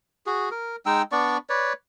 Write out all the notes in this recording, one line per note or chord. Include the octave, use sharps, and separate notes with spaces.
F#4 G#4
A#4
G#3 D#4 G5 E6
B3 D4 D5 C#6
B4 C#5 D5